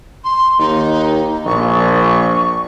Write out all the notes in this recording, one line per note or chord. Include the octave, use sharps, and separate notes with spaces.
C6
D#2 D#4
A#1 C#6